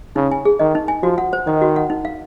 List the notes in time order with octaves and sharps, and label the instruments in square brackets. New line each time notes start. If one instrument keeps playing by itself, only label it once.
[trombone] C#3 [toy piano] D#4
[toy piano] G#5
G#4
[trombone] D#3 [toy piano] D#5
[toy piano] D#4
G#5
[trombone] F3 [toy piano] F#4
[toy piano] F#5
C5
[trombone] D#3 [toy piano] D#5
[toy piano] F#4
F#5
D#4
F5